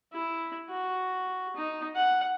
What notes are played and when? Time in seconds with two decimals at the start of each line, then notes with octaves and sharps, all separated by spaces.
0.13 E4
0.70 F#4
1.56 D#4
1.95 F#5